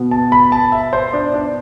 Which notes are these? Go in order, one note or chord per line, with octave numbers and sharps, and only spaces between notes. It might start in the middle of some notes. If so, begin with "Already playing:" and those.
Already playing: B2 B3
A5
B5
A5
E5
C5
D4
D4